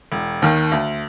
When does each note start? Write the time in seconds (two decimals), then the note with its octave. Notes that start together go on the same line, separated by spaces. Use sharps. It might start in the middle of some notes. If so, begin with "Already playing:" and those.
0.12 E1
0.42 D#2 D#3
0.72 D2